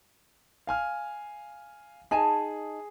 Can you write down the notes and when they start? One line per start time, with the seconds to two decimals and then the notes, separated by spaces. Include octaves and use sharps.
0.67 F5 G#5 F6
2.11 D#4 G#4 G#5 A5